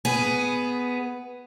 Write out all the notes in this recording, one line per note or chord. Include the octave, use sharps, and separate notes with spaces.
B3 G#4